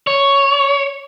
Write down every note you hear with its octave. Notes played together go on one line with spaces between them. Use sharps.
C#5